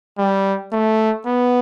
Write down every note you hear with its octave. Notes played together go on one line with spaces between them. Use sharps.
G3
A3
B3